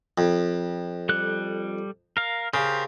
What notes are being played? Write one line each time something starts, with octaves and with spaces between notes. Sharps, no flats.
F2
G3 A4 F#6
A#4 F5
C#3 G4 A#4 C5